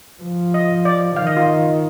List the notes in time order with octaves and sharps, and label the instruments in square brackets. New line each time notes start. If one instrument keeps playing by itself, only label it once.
[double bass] F3
[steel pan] D#5
D5
[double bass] D#3 [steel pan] F5
[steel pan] D#5
F4